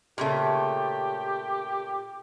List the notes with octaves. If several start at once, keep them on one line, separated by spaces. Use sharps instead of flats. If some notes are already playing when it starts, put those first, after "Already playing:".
A#2 C#3 A3 G4